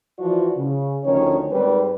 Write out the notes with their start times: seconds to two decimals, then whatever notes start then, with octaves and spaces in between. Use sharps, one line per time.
0.19 E3 F3 F#4 D5
0.56 C#3
1.04 D2 D#3 F3 C#4 C#5
1.51 G#2 G3 C4 A#4 B4